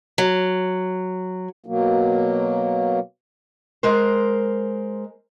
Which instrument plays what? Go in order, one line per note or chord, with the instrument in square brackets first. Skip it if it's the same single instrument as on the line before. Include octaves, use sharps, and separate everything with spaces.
[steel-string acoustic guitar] F#3
[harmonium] B2 F#3 A#3
[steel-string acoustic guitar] G#3 A#4 C5